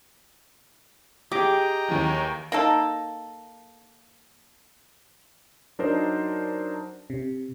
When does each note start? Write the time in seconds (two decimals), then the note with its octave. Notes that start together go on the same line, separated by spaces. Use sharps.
1.32 G4 G#4 D#5 G5 A#5 D6
1.88 D#2 D#3 E3
2.52 A#3 D#4 A4
5.79 F#3 D4 D#4 A#4 C5
7.10 C3